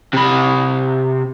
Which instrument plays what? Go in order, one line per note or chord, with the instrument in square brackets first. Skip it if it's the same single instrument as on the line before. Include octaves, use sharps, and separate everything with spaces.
[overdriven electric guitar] C3 B5